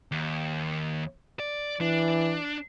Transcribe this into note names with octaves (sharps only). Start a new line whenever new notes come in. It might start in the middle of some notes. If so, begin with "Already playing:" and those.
D#2
D5
E3 D4